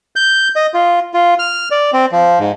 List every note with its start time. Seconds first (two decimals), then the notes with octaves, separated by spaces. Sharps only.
0.16 G6
0.56 D#5
0.74 F4
1.14 F4
1.39 F6
1.71 D5
1.93 C4
2.12 F3
2.40 G#2